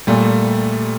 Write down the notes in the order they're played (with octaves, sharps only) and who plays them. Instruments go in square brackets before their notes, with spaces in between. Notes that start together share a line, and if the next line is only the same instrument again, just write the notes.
[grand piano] A#2 [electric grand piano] G3 A3